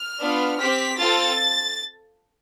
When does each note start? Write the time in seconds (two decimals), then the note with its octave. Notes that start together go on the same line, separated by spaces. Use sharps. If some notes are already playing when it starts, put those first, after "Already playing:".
Already playing: F6
0.20 B3 D4 F4
0.59 C4 G4 B6
0.99 C4 F4 A4 A6